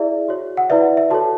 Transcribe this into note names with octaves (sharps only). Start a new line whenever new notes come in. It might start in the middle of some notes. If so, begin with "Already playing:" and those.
Already playing: E4 G#4 D5 E5
F#4 C#5
F#5
E4 B4 D5 E5
E5
F#4 A4 C#5 A5